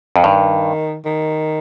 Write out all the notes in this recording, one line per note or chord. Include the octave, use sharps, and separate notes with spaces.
F2
G2 D#3
D#3